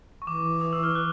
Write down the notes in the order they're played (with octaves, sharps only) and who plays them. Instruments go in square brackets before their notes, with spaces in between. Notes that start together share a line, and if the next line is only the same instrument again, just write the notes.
[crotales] C#6
[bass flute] E3 [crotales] D6
[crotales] D#6
E6
F6
F#6